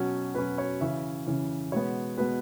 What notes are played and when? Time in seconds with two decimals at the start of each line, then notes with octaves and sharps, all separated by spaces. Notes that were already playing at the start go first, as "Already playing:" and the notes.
Already playing: B2 F#3 C#4
0.34 B2 F#3 C#4 B4
0.58 C#5
0.80 C#3 E3 C#4 E5
1.26 C#3 E3 C#4
1.72 B2 G#3 B3 C#5
2.18 B2 G#3 B3 B4